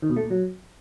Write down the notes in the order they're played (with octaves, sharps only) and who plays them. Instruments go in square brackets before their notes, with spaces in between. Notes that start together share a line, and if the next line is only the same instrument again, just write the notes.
[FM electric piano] D#3
B2
A3
A#2
F#3